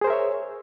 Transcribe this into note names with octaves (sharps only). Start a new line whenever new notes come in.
G#4 A#4 C5 C#5 E5